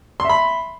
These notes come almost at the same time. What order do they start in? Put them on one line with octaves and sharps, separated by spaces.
C6 E5 B5